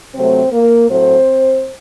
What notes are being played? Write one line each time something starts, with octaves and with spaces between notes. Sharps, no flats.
C3 F#3 A3 C4 C5
A#3 A#4
A2 F#3 A3 C4 C5